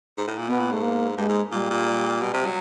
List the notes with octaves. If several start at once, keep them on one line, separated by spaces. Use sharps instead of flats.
G#2
A2
A#2
B2 B3
A#2
G#2 A3
A#3
G2 G#3
G#2
A#2 G3
A#2
B2
C3
F#3